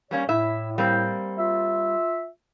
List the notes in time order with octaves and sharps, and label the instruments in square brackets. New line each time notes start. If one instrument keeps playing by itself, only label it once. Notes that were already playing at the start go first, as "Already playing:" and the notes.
[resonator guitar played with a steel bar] G3 A#3 C#4 [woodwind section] C#5
[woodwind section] A2 [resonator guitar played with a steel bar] E4 E5
[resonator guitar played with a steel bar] G3 A#3 C4
[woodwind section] F4 E5